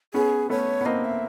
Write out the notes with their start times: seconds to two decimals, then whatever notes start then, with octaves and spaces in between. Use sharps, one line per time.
0.14 B3 C#4 G#4
0.50 A3 B3 C#5
0.81 B3
0.86 A#3 C4 D#5
1.05 E5